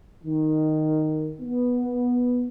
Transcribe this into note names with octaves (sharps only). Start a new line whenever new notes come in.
D#3
B3